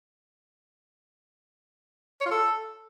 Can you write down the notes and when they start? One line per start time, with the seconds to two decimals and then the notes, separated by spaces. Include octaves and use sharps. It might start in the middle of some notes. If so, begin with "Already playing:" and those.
2.21 C#5
2.26 F4
2.31 A4